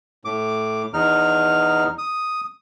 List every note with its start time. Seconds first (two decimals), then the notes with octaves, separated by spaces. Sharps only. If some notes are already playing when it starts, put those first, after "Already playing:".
0.25 A2 D6
0.94 E2 D#4 F6
1.98 D#6